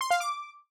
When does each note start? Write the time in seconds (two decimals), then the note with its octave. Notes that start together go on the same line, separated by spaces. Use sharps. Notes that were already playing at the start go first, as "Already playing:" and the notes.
0.01 C6
0.11 F5
0.20 D6